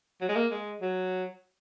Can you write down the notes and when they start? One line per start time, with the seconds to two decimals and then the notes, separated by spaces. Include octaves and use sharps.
0.21 F#3
0.29 G#3
0.36 A#3
0.51 G#3
0.82 F#3